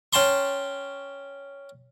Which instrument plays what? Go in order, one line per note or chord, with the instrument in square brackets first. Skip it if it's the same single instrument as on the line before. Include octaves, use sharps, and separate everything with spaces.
[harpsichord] C#4 G5 A5 C6 C#6